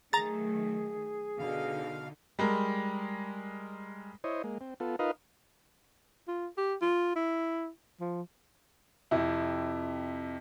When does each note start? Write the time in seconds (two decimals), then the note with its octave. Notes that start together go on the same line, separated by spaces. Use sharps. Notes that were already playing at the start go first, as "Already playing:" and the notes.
0.13 D#3 F#3 A3 G#4 A#5 A6
1.39 B2 D3 D#4 F5
2.39 G3 G#3 A#4
4.24 E4 C5 C#5 D#5
4.44 G#3 A#3
4.61 C4
4.80 B3 F4 A4
4.99 D#4 F4 A#4 B4 D#5 F5
6.28 F4
6.58 G4
6.82 F4
7.16 E4
8.01 F3
9.11 F2 C3 E4